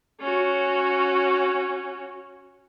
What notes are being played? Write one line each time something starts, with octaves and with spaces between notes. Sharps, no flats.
C#4 F#4